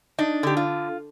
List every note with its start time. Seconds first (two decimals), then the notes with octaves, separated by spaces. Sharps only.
0.18 D4 D#4
0.43 D3 G4
0.57 F4